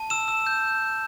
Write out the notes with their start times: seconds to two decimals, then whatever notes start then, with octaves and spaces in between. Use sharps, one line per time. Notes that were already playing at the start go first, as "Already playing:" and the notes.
Already playing: A5
0.10 E6 E7
0.28 E6
0.46 G6